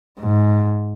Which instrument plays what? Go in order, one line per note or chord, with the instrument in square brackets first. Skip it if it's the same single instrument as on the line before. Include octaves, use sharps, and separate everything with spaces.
[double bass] G#2